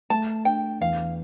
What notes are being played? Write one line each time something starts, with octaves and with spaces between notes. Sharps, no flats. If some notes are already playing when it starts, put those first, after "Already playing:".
A3 A5
D4 G5
E2 F5